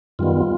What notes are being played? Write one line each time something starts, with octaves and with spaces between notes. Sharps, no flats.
F#2 D#3 G3 B3 F4